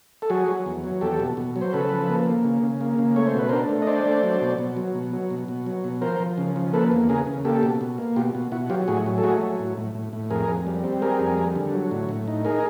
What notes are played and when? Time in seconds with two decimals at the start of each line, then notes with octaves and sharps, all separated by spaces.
0.22 A4
0.30 F#3 F#4 G#4
0.48 F#3
0.66 E2
0.84 F#3
1.01 E2 G4 A4
1.20 B2
1.37 B2
1.56 F#3
1.61 C5
1.73 C#3 A4 B4
1.92 F3
2.10 A#3
2.26 A#3
2.44 C#3
2.63 C#3
2.81 A#3
2.99 C#3
3.16 A3 C#5
3.27 C5
3.34 B2 B4
3.49 D4 A#4 C5
3.69 A3
3.82 D#5
3.87 D4 C5 D5
4.06 A3
4.23 F#3
4.41 B2
4.59 B2
4.77 F#3
4.95 B2
5.13 F#3
5.30 B2
5.48 B2
5.66 F#3
5.84 B2
6.01 F3 A#4 C5
6.20 F3
6.38 C#3
6.56 F3
6.73 A#3 A4 B4
6.92 E2
7.09 C#3 G#4 A#4
7.27 C#3
7.45 A#3 G4 A4
7.63 B2
7.81 B2
7.98 A#3
8.16 B2 F4 G4
8.35 B2
8.52 B2 E4 F#4
8.70 F#3 F4 G4
8.88 A2 F#4 G#4
9.06 F#3
9.18 A4
9.23 A3 F#4 G#4
9.41 F#3
9.59 A2
9.77 A2
9.95 A2
10.13 A2
10.30 F2 G#4 A#4
10.48 F2
10.67 G3
10.84 C4
11.02 G3 G#4 A#4
11.20 F2
11.38 G3
11.56 D3
11.74 F#3
11.91 A2
12.09 A2
12.28 D#4
12.45 D#4 G#4 A#4